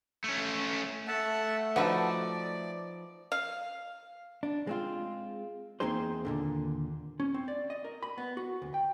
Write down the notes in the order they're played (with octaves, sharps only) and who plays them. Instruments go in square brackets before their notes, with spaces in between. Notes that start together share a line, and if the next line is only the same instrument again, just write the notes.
[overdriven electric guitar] A3 C#4
[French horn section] A3 [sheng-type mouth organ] E5 F#5 A5
[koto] F3 D#4 [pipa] F#4 B4 E5 [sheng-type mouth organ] D5
[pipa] F5
[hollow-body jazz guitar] D4
G#3 C4 F4
E2 A#3 C4 D#4 G#4 C5
D#2 A#2 D3
C#4
C4
D5
D#5
A#4
B5
B3
F#4
D2
G5